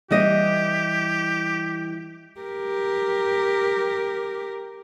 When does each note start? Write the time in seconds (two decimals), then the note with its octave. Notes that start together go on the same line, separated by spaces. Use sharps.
0.11 E3 G3 G4 D#5
2.40 G4 A#4